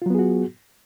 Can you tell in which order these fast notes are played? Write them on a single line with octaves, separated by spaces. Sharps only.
F4 F#3 B3 G#4 F#4